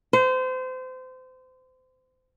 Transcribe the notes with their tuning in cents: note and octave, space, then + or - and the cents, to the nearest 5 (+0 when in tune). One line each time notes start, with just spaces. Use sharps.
C5 -30